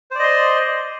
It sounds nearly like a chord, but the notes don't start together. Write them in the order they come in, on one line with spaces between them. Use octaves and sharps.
C5 D5 D#5 C6